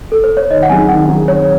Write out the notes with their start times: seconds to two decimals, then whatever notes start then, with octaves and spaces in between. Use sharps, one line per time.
0.12 A4
0.24 C5
0.37 C#5
0.50 D#3 D#5
0.63 F#5
0.69 F#3 C4 D#4 G#4 G#5
0.89 D#3 F#5
1.08 F#3 C4 D#4 G#4
1.28 D#3 C#5